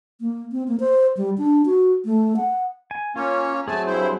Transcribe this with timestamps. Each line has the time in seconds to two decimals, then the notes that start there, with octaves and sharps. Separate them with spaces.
0.21 A#3
0.52 C4
0.68 A#3
0.80 C5
1.17 G3
1.38 D4
1.66 F#4
2.05 A3
2.36 F#5
2.91 G#5
3.16 A#3 C#4 F4 C#5
3.68 F#3 A3 C4 G#4 G#5 A5
3.87 G2 E4 C5